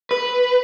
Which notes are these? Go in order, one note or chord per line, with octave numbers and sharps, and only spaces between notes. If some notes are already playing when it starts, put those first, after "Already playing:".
B4